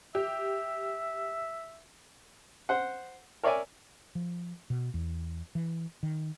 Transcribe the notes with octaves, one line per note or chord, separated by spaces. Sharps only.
G4 E5
C5 F#5
A#4 C#5 D5 E5 G#5
F3
B2
E2
E3
D#3